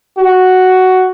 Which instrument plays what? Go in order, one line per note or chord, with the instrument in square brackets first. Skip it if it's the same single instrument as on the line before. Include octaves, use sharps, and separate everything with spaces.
[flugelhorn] F#4